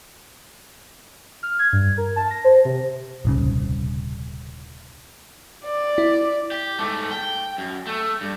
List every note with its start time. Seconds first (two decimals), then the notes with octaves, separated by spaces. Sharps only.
1.43 F6
1.59 G#6
1.73 G2
1.98 A#4
2.16 A5
2.31 A#6
2.44 C5
2.65 C3
3.25 D#1 C2 C#3
5.64 D5
5.98 E4
6.52 G4
6.79 G#2 A3
7.11 G5
7.58 F#2
7.87 A3
8.21 G2